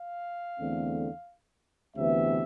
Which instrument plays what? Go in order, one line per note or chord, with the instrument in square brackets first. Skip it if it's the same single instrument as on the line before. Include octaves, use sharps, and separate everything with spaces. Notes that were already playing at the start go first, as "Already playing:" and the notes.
Already playing: [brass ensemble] F5
E2 D3 A3 C4
D2 C3 E3 B3 E5